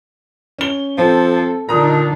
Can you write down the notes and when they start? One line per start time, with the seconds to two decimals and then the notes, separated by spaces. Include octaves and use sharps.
0.58 C#4 G7
0.98 F3 C4 A4
1.69 A#2 D3 D4 D#4 A#5 D#6